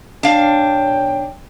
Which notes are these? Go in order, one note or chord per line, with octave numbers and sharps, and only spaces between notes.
B1 D4 C#5 F5 G5